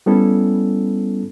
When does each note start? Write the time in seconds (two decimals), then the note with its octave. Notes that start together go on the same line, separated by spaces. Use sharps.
0.06 G3 B3 C#4 E4 A4